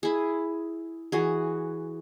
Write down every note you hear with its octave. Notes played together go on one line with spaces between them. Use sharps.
E4 G#4
E3 F#4 G#4